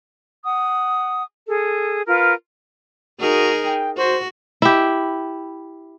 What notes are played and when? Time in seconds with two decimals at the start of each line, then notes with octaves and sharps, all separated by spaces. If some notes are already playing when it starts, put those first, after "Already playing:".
0.44 F#5 D#6
1.47 G#4 A4
2.06 F4 A#4 B4
3.20 D#4 F#4 G#4 A#4
3.65 G5
3.97 F#4 C5
4.62 E4 G4